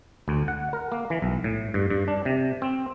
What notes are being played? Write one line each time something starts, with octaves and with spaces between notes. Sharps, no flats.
D2
F#5
A#4
A#3
E3
B1
A2
G2
G2
D4
C3
C4